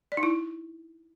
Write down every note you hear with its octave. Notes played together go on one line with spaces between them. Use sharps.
D5
D#4
E4